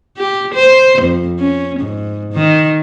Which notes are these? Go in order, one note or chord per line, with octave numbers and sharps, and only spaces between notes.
G4
C5
F2
C#4
G#2
D#3